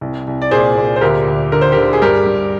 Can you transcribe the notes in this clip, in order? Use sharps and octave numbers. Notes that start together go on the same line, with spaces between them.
C2
C2
D5
A#2 G#4 C5
A#2
C5
D2 G4 A#4
D2
D3 A#4
C5
G4 A#4
D3
G#4
G2 G4 A#4
G2